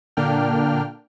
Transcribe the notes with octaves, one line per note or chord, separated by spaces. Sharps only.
A#2 D3 A#3 D4 G5 F6